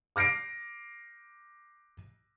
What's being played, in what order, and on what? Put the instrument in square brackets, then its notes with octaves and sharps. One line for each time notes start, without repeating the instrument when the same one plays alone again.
[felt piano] D6 F6 A#6 C7 D7